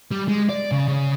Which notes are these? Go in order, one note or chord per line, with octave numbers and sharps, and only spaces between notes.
G3
G#3
D5
C#3
C#3